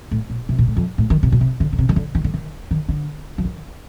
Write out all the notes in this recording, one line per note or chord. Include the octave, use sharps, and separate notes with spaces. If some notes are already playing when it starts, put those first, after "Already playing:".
A2
A#2
C3
A#2
A2
F2
A2
D#3
C3
A#2
C3
D3
D3
C3
D#3
D3
D#3
D3
D#3
D#3
D3
F3
D#3